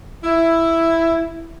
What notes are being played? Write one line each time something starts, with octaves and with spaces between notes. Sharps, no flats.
E4